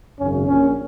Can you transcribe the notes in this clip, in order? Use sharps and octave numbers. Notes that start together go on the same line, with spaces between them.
G#1 F#2 C#3 C#4
A#1 A#2 C#4